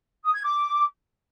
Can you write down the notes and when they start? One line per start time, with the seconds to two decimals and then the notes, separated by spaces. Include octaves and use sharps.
0.24 D#6
0.34 G#6
0.43 D6